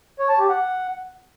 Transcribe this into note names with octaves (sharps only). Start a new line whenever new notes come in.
C#5
A5
G4
F#5